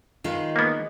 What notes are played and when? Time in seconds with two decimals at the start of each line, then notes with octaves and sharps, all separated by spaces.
0.24 D#3 G#3 F4 B4
0.56 A#3 B3